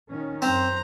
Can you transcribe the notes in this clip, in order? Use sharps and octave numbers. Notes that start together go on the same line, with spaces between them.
A#2 D#3 C#4
F#2 C4 C5 A#5